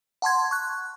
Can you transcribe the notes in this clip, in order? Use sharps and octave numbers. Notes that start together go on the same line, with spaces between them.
F#5 A5 C6 G#6
C#6 F#6